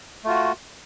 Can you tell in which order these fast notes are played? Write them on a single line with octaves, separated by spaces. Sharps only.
A3 F4 F#4